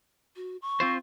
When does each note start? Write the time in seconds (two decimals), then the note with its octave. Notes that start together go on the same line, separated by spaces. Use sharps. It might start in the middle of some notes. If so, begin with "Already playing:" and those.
0.36 F#4
0.62 C#6
0.80 C4 F4 C5